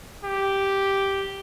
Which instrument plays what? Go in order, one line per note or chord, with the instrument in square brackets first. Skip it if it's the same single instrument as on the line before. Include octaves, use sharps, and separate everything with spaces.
[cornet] G4